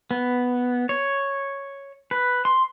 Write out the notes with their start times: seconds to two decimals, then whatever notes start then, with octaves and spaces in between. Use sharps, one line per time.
0.11 B3
0.89 C#5
2.11 B4
2.45 C6